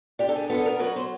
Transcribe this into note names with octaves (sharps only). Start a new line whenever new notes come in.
D4 G4
A4
G#4
B3 A4
A#4
F#3 B4
C5